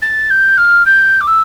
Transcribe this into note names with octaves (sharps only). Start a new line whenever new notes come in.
A6
G6
F6
G6
D6
E6